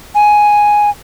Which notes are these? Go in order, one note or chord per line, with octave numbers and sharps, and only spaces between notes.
G#5